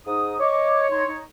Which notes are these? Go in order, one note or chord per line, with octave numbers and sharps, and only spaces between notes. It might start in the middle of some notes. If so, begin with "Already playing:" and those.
G#2 D#4 D#6
C#5 D#5 D6
D#4 C6 G#6
D#4